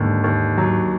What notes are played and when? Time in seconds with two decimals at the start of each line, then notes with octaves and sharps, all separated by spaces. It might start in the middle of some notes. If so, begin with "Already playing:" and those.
Already playing: D#2 G#2 D3
0.24 D#2
0.58 F#3